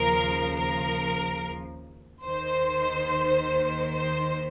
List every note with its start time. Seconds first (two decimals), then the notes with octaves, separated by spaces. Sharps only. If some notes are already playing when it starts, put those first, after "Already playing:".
Already playing: D#2 C#3 F3 A#4
0.58 A#4
2.25 D#2 D#3 C5
3.92 C5